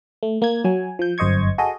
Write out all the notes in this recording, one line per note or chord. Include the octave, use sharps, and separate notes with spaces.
A3
A#3 G#6
F#3 G#5
F3 G6
G1 F#2 C5 D#5 C#6 G#6
F#4 G#4 A4 D#5